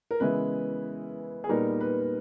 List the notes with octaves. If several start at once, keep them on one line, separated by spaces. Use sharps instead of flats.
A#4
C#3 E3 G#3 B3 E4 B4
G#4
A#2 G3 B3 D#4 A#4
B4